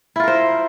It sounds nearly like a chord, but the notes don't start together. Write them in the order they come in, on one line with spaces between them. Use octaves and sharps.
E4 F4 A#4 C5